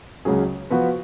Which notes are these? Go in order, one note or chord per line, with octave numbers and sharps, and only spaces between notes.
C#2 C#3 F#3 C#4 G#4
F3 B3 F#4 B4